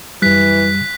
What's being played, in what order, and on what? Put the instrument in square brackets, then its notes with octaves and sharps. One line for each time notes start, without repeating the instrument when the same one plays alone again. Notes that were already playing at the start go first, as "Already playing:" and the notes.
[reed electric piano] F#2 G3 [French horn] E3 [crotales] F#6 B6